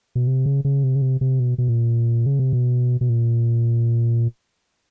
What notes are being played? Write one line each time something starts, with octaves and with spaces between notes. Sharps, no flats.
B2
C3
C#3
C#3
C3
C#3
C3
C3
B2
B2
A#2
C#3
C3
B2
B2
A#2